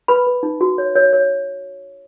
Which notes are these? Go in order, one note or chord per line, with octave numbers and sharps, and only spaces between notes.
B4 B5
B4
D#4
F#4
C#5
C#5
C#5